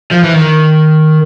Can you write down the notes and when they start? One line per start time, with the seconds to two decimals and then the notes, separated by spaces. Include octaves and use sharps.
0.11 F3
0.23 E3
0.35 D#3